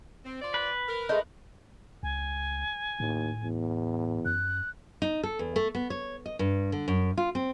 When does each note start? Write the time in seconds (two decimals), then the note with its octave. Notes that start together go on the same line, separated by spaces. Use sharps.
0.24 C4
0.41 F4 C5 D5
0.54 B4
0.88 A#4
1.09 G#3 A3 D#4
2.03 C#2 G#5
3.00 D#2 A2
3.43 E2
4.25 F#2 F#6
5.02 D#4
5.23 A4
5.39 E2
5.56 A3
5.75 B3
5.90 C#5
6.26 D#5
6.39 G2
6.72 D3
6.88 F#2
7.18 F4
7.35 C4